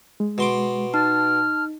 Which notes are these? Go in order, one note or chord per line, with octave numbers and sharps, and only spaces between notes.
G#3
B2 C6 D6
D#4 A5 F6